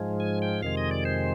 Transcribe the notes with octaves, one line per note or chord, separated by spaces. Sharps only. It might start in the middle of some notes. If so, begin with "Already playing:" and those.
Already playing: G#2 F3 G#3
G#5
G5
F2 C3 D#3 G#3 F5
D#5
D5
C5